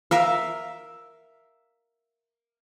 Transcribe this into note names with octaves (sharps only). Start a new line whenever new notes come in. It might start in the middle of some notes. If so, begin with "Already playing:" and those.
A#4 E5 F5